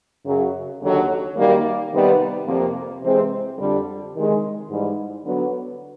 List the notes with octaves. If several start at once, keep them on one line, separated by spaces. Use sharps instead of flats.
F#2 C#3 F#3
D#2 D3 F#3
F#2 D#3 G3 A#3
C3 D#3 G3 B3
F2 C3 F3 A#3
C3 E3 G#3 C4
F2 D3 G3
C3 D#3 G#3
G#2 E3 G3
D3 F#3 B3